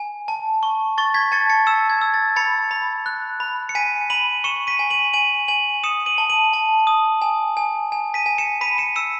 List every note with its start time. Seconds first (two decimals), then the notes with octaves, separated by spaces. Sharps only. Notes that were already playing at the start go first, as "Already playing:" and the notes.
Already playing: G#5
0.28 A5
0.63 C#6
0.98 C#6 A6
1.14 G#6 B6
1.32 A5 A6 C#7
1.50 A6 C#7
1.66 E6 C#7 E7
1.90 G#6
2.02 E6
2.14 A6
2.36 B5 A6 C#7
2.71 B5
3.06 F#6
3.40 B5
3.69 C#7
3.75 G#5 B6 D#7
4.10 B5 D#7 F#7
4.44 C#6 C#7 E7
4.67 B6 D#7
4.79 G#5
4.90 D#7 F#7
5.13 G#5 D#7 F#7
5.48 G#5 D#7 F#7
5.84 D#6 C#7 E7
6.06 D#7 F#7
6.18 A5
6.30 D#7 F#7
6.53 A5
6.87 D#6
7.22 G#5
7.57 G#5
7.92 G#5
8.14 B6 D#7
8.26 G#5
8.38 C#7 E7
8.61 B5 B6 D#7
8.78 C#7 E7
8.96 E6 C#7 E7